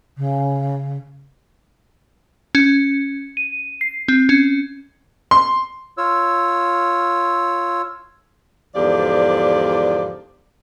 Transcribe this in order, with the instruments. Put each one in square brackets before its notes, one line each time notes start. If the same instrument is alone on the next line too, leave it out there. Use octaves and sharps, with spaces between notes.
[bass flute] C#3
[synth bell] C#4
D#7
C7
C4
C#4
[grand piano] C6
[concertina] F4 C#5 E6
[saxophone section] E2 G#2 D3 F3 G4 D5